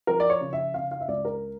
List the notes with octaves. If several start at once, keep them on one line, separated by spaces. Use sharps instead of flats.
F3 A#4
D5
C#5
C#3
E5
C#3 F5
F5
E5
C#2 D5
A#4